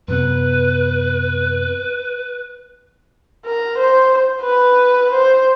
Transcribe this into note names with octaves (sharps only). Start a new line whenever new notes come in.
F#2 C3 B3 B4
A#4
C5
B4
C5